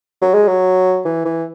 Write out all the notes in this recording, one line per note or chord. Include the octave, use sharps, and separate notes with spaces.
F#3
G#3
F#3
E3
E3